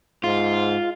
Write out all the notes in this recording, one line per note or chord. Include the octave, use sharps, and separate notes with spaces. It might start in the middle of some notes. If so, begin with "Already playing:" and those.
G#2 F4